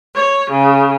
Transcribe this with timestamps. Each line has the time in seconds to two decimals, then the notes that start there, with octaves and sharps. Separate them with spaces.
0.15 C#5
0.50 C#3